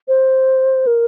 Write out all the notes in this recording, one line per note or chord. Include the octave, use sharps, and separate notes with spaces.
C5
A#4